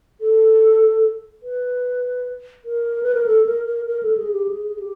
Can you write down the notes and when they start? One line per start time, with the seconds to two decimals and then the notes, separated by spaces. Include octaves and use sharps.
0.21 A4
1.43 B4
2.65 A#4
3.03 B4
3.15 A#4
3.26 A4
3.46 A#4
3.67 A#4
3.87 A#4
4.03 A4
4.17 G#4
4.33 G4
4.48 G#4
4.68 G#4
4.79 G4